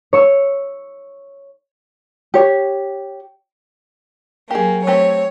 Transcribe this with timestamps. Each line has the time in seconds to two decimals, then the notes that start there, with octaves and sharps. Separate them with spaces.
0.13 C#5 C#6 E6
2.34 G4 C#5
4.51 F#3 A#3 G4 G#4
4.87 A3 C4 G4 C#5